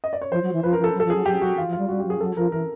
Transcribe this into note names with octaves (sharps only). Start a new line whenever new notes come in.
D#5
D5
C#5
F3 C5
F#3
E3
F3 B4
A#4
F3
A4
F#3
F3 A4
F#3 G#4
F#3 G4
F#3 F#4
E3 F4
F3
F4
G3
G3 F#4
F#3 G4
G#4
F#3 A4
F3 A#4
E3 A#4